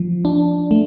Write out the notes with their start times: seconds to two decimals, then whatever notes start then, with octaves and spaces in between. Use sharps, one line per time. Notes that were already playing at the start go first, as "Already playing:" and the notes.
Already playing: F3
0.25 D4
0.71 A3